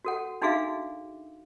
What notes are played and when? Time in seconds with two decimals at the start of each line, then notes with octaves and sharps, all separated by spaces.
0.05 F#4 A4 F#5
0.42 D4 D#4 F#4 G#4 E5 F5